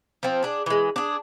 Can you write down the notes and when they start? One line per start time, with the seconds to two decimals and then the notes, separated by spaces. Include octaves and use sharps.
0.23 F3 C4
0.43 D4 G#4
0.66 E3 G#3
0.96 D4 G#4